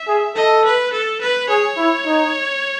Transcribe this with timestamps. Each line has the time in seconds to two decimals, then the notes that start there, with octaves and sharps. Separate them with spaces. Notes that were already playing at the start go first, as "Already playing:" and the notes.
Already playing: E5
0.08 G#4
0.36 A4 D#5
0.65 B4
0.93 A4
1.21 B4
1.49 G#4 C#5
1.78 E4
2.06 D#4